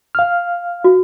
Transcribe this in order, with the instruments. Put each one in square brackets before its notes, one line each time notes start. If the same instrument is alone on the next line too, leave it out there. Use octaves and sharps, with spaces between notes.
[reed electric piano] F5 F6
[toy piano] F#4